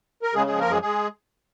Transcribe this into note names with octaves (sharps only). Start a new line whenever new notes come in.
A#4
C#3 G#3 G#4
F3 G#3 G#4
A#3 A#4
F#2 G#3 G#4
G#3 G#4